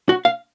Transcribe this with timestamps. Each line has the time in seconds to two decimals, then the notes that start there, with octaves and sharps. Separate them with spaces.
0.09 F#4
0.25 F5